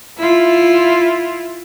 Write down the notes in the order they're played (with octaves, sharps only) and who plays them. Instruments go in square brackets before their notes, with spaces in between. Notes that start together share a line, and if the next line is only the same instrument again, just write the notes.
[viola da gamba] E4 F4